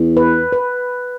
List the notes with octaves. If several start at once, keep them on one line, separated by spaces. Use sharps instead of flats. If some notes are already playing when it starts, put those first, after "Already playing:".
Already playing: E2
B4
B4